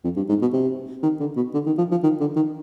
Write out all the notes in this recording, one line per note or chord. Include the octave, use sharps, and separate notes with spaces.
F2
G2
G#2
B2
C3
D#3
D3
B2
D3
D#3
F3
F3
D#3
D3
D#3